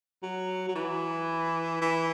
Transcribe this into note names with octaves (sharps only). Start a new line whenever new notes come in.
F#3
F#3
E3
E3